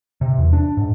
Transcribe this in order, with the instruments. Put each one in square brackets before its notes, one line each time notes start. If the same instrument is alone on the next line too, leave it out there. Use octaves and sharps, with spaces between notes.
[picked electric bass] C3
E2
D4
G#2